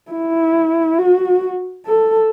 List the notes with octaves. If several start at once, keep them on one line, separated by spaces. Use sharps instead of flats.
E4
F#4
A4